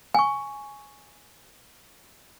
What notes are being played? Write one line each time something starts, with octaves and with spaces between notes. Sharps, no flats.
G#5 C#6